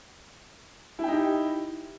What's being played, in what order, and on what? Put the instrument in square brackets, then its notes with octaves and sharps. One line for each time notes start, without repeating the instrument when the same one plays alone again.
[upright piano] E4
G5
D#4
G4